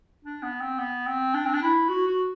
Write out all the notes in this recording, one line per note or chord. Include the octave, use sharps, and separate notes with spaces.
D4
B3
C4
B3
C4
D4
C4
D4
E4
F#4
F#4